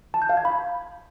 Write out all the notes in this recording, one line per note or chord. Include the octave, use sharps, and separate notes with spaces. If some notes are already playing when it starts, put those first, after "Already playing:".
A5
G6
F5
G#6
B5